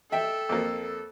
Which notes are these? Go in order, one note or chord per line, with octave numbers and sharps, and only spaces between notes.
A4 E5 G5
F2 A#3